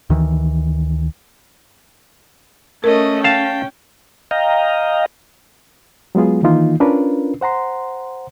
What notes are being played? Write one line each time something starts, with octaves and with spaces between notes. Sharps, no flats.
D2 D#3 E3
A3 C#4 A#4 D#5
F5 G5 A5
D#5 F5 G5 A#5
F#3 G#3 B3 F4 G#4
D#3 E3 A#3 D#4 F4
C#4 D4 F4 A#4 B4
C5 F#5 A#5 C6